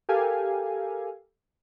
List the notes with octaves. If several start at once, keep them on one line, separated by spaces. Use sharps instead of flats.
G4 A4 A#4 F5 G#5